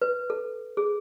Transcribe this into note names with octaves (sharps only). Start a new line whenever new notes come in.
B4
A4
G#4